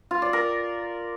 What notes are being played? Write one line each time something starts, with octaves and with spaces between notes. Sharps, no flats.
F4
D5
A#4